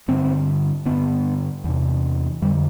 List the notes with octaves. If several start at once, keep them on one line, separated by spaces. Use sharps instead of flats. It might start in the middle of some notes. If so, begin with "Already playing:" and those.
G2 D3 C4
G2 D3 B3
E2 C3
F2 D3 G3